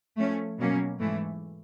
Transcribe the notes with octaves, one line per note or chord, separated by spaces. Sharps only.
F3 A3 C#4
B2 F#3 A#3 C#4
G#2 E3 A3